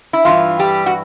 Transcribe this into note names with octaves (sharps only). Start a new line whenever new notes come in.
E4
G2 E3 F4
G3 G4
F#4